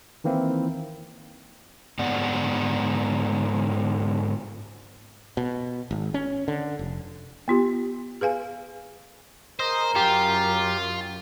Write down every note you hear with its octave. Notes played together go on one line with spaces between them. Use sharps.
D#3 E3 A#3 C4 E4
G#2 D3 B3 D5 F#5
B2
G#1
C#4
D3
F1
B3 F4 G4
G#4 B4 F5 G#5
G#4 A#4 C5 D#5
F#2 F4 G4